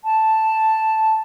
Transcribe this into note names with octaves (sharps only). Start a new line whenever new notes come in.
A5